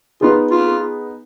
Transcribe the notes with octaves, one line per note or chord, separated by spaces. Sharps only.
B3 D#4 F4 G#4
F4